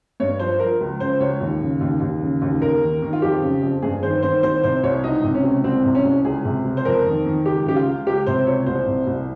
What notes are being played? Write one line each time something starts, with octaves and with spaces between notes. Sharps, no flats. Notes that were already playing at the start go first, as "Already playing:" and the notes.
G2 C#5
F3 C5
F3 A#4
C#2
C#3 C5
C#2 C#5
D#2
C#3
D#2
D#2
C#3
D#2
D#2 A#4
D#3
D#3
F4
F2 G4
C#3
F2
G2 G#4
D#3 C5
D#3 C5
C2 C5
C3 C5
C2 C#5
C#2 D#4
C3
C#4
C#2
C2 C4
C3
C#4
C2
C#2 G#4
C3
C#2
C5
F2 A#4
D#3
D#3
C#2 G4
C#3 G4
F4
C#2
C#2 G4
C3 C5
C#2 C#5
C2 C5
C3
C2